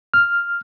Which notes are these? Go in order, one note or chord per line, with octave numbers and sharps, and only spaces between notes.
F6